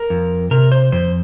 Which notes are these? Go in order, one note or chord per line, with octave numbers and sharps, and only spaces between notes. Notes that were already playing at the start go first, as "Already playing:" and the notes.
Already playing: A#4
F2
C3 A#4
C5
F2 C5